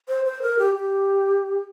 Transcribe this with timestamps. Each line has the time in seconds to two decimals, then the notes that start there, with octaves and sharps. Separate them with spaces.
0.09 C5
0.25 C5
0.42 A#4
0.59 G4
0.75 G4